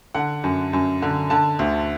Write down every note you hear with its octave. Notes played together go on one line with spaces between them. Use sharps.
D3 F#5
F#2
F#2
D3
D3 A5
D2